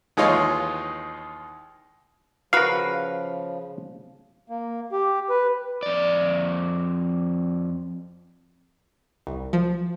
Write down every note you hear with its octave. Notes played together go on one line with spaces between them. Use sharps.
D#2 E3 G#3 D#4 F4 C#5
C#3 F3 F#4 A#4 B4 F5
A#3
G4
B4
F2 D5
C2
F3